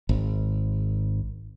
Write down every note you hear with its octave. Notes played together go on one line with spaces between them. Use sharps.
G#1